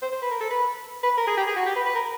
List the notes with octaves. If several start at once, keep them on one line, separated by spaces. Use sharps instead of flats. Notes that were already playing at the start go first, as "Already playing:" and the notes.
C5
C5
B4
A#4
A4
B4
B4
A#4
G#4
G4
G#4
F#4
G4
B4
B4
A#4